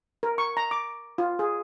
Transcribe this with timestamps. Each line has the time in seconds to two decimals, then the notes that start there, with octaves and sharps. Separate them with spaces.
0.23 A#4
0.38 C#6
0.57 A#5
0.71 D6
1.18 F4
1.39 G#4